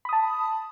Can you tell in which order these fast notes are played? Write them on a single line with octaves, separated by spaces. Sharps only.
B5 D#6 A5